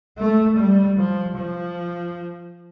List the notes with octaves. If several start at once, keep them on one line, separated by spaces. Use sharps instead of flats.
A3
G3
F3
F3